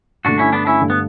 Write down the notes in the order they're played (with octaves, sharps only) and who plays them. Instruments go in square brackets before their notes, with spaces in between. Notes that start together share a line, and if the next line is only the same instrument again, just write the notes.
[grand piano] G2 D3 A3 [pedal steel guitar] D4 F#4
[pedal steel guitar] C#4 E4
B3 D4
C#4 E4
[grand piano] G2 D3 A3
[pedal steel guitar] B3